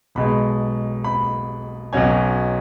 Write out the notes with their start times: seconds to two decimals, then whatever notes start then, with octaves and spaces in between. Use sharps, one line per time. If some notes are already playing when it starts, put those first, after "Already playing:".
0.15 B1 B2 G#3 B5
1.04 B5
1.93 B1 B2 F#3 C#4 G#5